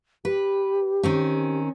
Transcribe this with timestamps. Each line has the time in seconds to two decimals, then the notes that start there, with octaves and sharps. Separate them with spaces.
0.25 G4 B4
1.03 D#3 C4 C#4